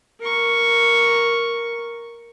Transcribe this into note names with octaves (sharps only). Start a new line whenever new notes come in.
A#4 C#6